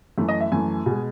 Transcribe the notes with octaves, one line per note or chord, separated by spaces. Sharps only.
F#2 E3 A3
D#5
E5
F#2 E3 A3 G#5
B2 G#3